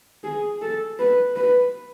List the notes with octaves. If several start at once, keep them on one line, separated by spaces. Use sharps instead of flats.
G#4
A4
B4
B4